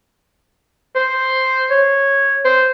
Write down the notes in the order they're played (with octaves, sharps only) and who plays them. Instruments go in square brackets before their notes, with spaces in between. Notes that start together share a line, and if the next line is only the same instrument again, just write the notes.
[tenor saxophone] C5
[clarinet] C#5
[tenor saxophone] C5